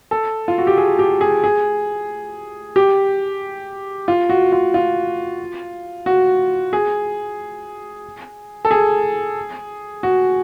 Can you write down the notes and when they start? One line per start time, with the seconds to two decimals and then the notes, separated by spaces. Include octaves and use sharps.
0.11 A4
0.48 F4
0.58 F#4
0.67 G4
0.78 G#4
0.99 G4
1.21 G#4
1.44 G#4
2.76 G4
4.08 F4
4.29 F#4
4.52 F4
4.74 F4
6.06 F#4
6.73 G#4
8.65 A4
8.71 G#4
10.03 F#4